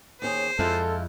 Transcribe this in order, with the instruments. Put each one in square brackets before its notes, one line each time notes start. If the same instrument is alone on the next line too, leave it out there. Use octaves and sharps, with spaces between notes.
[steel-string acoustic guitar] D#2 C#4 G#4 [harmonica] C5
[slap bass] F2 [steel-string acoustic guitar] G#3 E4 F4 [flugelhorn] A4